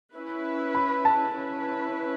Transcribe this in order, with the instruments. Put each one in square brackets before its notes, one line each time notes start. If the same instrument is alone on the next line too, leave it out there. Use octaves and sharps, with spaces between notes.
[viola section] C#4 E4 B4
[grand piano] B5
A5
[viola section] C#4 E4 B4